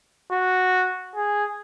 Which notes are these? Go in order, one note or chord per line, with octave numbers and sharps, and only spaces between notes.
F#4
G#4